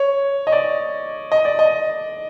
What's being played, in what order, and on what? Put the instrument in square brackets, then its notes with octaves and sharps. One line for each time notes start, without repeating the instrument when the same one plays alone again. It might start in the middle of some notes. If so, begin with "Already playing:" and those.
Already playing: [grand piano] C#5
D#5
D5
D#5
D5
D#5